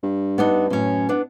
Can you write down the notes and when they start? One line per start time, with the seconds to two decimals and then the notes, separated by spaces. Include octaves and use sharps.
0.03 G2
0.38 B3 D4 D#4
0.70 F#2 A2 C#4
1.09 B3 D4